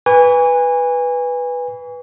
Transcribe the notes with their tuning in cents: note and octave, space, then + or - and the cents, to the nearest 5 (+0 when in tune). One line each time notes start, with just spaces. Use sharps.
B4 +0 G#5 -25 C#6 +45